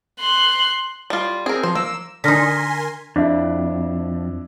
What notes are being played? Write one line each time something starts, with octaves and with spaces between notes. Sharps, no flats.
C6 F#6
G3 F4
C4 G#4 A#4
F3 C5
A#3 E6
D3 D#4 A#4 G#5 C6 F6 A#6 B6
F2 D4 E4